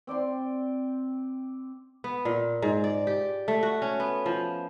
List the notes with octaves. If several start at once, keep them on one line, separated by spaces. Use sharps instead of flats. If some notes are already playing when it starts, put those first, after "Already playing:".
C4 D5 G5 C6
B3
A#2
G#2
D5
G4
A3
F#4
C#4
B3
F3